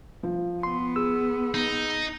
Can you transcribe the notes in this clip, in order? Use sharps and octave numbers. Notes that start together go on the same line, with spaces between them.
F3
B3 C6
G#4 E6
D#4